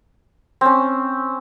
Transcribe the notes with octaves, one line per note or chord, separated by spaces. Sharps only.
C4 C#4